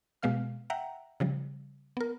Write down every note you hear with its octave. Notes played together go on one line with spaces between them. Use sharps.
B2 G#3 B3 F5 F6
E5 F#5 G5 A#5
C#3 F3 G3
B3 A#4